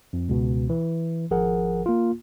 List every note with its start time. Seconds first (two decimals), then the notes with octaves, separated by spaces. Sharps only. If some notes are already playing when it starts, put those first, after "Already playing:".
0.13 F2
0.29 C#2 B2
0.70 E3
1.31 G#1 F3 G#4 A#4 F#5
1.86 A#3 F4